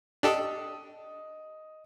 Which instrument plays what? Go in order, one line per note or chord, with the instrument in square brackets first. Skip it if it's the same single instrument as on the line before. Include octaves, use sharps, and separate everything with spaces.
[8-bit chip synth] D4 G4 A4 [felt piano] D#5 D#6